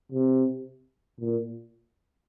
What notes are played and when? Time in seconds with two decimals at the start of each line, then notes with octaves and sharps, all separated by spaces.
0.12 C3
1.20 A#2